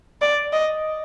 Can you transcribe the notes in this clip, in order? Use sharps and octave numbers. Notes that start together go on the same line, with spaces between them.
D5
D#5